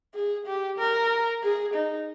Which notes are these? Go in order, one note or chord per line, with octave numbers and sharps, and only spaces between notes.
G#4
G4
A#4
G#4
D#4